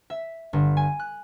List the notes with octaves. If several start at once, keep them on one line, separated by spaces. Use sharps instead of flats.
E5
G1
G#5
F#6